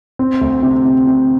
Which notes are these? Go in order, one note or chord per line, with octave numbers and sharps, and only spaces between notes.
C4
D2
C3
C3
C3